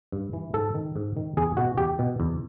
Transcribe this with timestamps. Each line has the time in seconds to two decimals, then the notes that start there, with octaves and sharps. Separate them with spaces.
0.12 G2
0.33 E3
0.53 G#2 A4
0.75 D#3
0.96 G#2
1.17 D#3
1.37 E2 G#4
1.57 B2 F#4
1.78 E2 G4
1.99 B2
2.20 E2